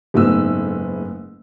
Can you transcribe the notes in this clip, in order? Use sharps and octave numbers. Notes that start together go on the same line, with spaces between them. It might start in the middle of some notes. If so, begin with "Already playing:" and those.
F#1 G#2 A3 B3 E6